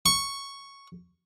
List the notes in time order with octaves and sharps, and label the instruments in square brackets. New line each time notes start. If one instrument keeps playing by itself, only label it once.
[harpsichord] C#6